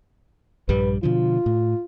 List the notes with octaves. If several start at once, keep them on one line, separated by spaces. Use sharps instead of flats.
A#1 G2 G3 B4
B2 D3 F3 F4
A2